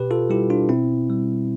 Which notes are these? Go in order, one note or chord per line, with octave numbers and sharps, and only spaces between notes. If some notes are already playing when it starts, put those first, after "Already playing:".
Already playing: B2 G4 B4
F4 A4
G3 E4 G4
D4 F4
B2 C4 E4
G3